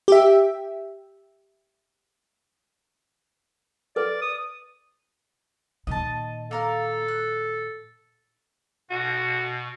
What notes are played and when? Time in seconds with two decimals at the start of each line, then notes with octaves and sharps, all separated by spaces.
0.08 G4 E5
3.96 A4 B4 D5
4.22 D#6
5.87 A#2 D#3 D#5 A5
6.51 A#3 A4 A#4 F5
7.08 F#6
8.90 B2 F#4